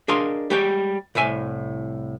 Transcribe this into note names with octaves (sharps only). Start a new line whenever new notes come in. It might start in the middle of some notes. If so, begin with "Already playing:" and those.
D4 G#4 A#4 D#5 F5 C6
G3 G#3 G4 C#5 G5
C2 A2 E5 G#5